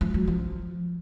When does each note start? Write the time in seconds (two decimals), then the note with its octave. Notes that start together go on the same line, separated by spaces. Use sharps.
0.01 F3
0.14 F#3
0.27 F3